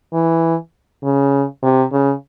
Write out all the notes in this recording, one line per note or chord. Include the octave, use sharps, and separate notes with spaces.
E3
C#3
C3
C#3